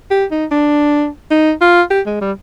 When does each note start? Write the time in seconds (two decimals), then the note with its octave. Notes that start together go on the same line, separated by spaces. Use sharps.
0.11 G4
0.31 D#4
0.51 D4
1.31 D#4
1.61 F4
1.90 G4
2.06 G#3
2.21 G3